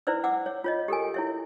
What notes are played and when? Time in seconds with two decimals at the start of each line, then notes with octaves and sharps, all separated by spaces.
0.07 E4 B4 C5 D5 E6
0.24 F#5 D6 E6
0.46 C#5
0.64 F4 C#5 D#5
0.88 G4 A4 A#4 G#5
1.14 E4 C#5 E5